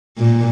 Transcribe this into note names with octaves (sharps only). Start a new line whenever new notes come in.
A#2